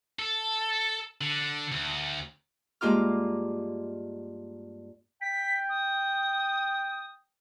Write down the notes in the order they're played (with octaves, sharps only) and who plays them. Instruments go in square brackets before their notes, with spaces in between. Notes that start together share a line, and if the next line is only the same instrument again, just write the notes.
[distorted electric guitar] A4
D3
D2
[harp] G2 G#3 A#3 F4 D6 F6
[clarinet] G5 [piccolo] B6
[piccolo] D#6